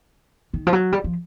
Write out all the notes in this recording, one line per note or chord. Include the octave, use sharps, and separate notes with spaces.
D#3
F3
F#3
G3
F3